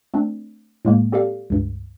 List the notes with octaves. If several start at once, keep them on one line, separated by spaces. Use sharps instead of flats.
A3 C4 D4
A2 G#3 A#3
C4 G4 A4 D5 F5
C#2 G2